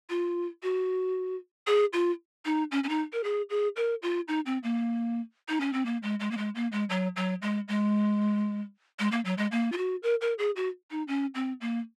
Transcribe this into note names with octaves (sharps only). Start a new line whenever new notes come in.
F4
F#4
G#4
F4
D#4
C#4
C#4
D#4
A#4
G#4
G#4
A#4
F4
D#4
C4
A#3
D#4
C#4
C4
A#3
G#3
G#3
A#3
G#3
A#3
G#3
F#3
F#3
G#3
G#3
G#3
A#3
F#3
G#3
A#3
F4
F#4
A#4
A#4
G#4
F#4
D#4
C#4
C4
A#3